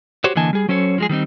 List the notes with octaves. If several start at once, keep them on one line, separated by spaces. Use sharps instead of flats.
F#4 G4 C5 C#5
D3 E3 A#3 D#5 G#5 A5
G3 G#4
F#3 C#4 A4 C5 C#5
F3 G#3 G#4
D#3 G3 C4 D#4